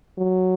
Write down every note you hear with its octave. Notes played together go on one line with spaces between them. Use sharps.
F#3